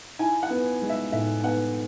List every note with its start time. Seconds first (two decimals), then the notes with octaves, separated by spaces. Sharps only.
0.19 E4 G#5
0.43 F#5
0.50 B3
0.82 G#3
0.90 E5
1.12 A2 E5
1.43 B3 F#5